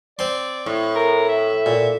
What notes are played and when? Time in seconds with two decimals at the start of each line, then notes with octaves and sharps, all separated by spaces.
0.19 C4 D5 C6
0.66 A2
0.95 A#4
1.29 E5
1.66 A#2